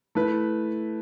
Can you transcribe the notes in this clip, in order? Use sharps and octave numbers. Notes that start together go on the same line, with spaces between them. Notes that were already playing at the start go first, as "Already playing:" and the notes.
A3 E4 B4